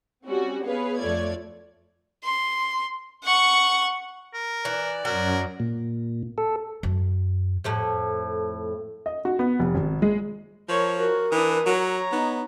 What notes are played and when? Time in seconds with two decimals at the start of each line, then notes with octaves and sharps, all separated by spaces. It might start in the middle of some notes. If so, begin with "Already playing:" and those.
0.25 G3 C4 C#4 F#4
0.64 B3 G#4 B4 C#5 F5
0.98 F2 A3 F4 C#5 D5 G#6
2.24 C6
3.24 F#5 C#6
4.34 A#4
4.65 E3 D5
5.05 F#2 F#3 A#4
5.60 A#2
6.38 A4
6.83 F#2
7.64 F2 A2 A3
9.06 D#5
9.25 F#4
9.39 B3
9.59 F1
9.75 G#1
10.02 G#3
10.69 F3 A#4 C#5
10.98 F#4 A#4
11.32 E3 D4 D#6
11.66 F#3 C#5 A#5
12.12 B3 D#4